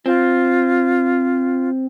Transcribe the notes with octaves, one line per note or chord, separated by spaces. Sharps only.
C4 F4